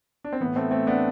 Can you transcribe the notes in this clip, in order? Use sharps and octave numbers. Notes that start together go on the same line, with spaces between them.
D4
C4
A2 E3 B3
A3 C4
A3 C4
B3 D4